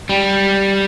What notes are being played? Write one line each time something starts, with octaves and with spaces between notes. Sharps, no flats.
G3